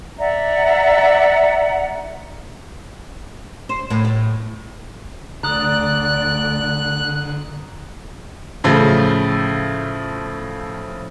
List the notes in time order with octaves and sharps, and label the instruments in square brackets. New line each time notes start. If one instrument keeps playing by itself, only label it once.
[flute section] D5 E5 F#5 A#5
[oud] C5
A2
A2
[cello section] D2 D5 [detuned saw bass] D3 [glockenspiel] A#5 D#6 [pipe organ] F#6
[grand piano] A2 C#3 F3 A3